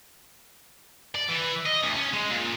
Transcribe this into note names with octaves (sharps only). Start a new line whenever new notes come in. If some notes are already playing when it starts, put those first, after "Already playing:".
D5
E3
D#5
D2
C#4
G#3
A#2